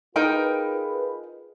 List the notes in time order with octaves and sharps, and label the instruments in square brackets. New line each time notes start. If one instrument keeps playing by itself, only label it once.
[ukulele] D#4 A#4 G5 [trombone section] F4 G#4 B4